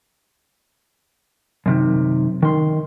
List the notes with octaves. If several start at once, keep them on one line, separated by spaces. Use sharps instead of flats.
F#2 C3 D#3
D#3 C6